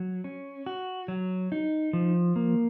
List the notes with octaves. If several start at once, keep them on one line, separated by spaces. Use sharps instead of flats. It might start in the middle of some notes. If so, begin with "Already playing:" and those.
Already playing: F#3
C#4
F#4
F#3
D#4
F3
A#3